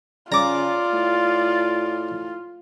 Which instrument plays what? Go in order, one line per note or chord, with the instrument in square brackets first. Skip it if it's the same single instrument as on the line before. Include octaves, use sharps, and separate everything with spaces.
[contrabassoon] C#3 [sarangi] F4 [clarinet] D5 [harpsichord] A#5 D6
[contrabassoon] A2